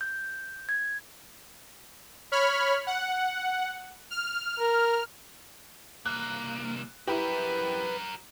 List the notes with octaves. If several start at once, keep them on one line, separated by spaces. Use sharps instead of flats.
G6
G#6
C#5 B5 F6
F#5
F6
A#4
C2 A#3 F#6
E4 F#4 G4 A#4 B4